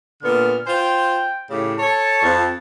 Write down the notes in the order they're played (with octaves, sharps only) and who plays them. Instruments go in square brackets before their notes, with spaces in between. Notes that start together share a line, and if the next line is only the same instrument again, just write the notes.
[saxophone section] A#2 D3 B3 [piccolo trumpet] F6
[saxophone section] F4 C5 [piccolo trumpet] G5
[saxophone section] A2 C#3 G4
[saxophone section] A4 C#5 [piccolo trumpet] A5
[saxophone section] F2